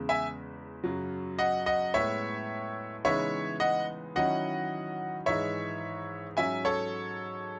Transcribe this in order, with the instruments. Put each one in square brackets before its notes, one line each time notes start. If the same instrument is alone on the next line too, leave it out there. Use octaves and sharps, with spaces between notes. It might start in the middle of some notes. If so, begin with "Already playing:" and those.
Already playing: [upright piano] E2 C#3 G#3
[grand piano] E5 G#5
[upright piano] F#2 C#3 F#3
[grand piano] D#5 F#5
D#5 F#5
[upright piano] A2 G#3 B3 [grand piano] C#5 E5
[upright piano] C#3 E3 G#3 B3 D#4 [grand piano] C#5 E5
[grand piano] D#5 F#5
[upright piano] D#3 F#3 C#4 E4 [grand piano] D#5 F#5
[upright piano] G#2 E3 G#3 D#4 [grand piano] C#5 E5
[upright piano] G#2 F#3 C#4 [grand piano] E5 G#5
[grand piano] A4 C#5